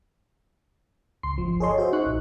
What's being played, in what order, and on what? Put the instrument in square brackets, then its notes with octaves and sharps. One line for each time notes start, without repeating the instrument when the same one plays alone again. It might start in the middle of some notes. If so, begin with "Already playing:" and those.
[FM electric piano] C#2 C6 C7
G1 F3
G#4 A4 C#5 D#5 C6
F#4 C5 E5
D#4 C#6 F#6
A#1